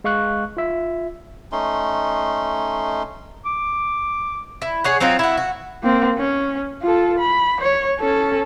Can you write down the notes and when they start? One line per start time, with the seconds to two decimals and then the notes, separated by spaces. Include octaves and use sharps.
0.04 G#3 F5 C#6 F#6
0.57 F4 E5
1.52 A3 C#4 D#4 C6
3.45 D6
4.62 E4
4.84 G#4 C#5 F#5
5.00 F#3 C4 D#4 F4
5.19 E4 F#4
5.38 F#4
5.83 A#3 C4
6.17 C#4
6.82 F4 A4
7.18 B5
7.60 C#5
7.99 C#4 A4